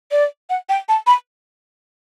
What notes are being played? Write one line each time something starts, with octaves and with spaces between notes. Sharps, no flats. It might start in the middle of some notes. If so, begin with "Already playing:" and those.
D5
F#5
G5
A5
B5